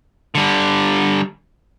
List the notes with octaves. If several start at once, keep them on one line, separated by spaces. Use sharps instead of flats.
D3 G3